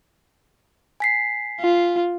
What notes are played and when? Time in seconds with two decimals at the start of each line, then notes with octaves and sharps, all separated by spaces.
1.00 G#5 B6 C7
1.61 F4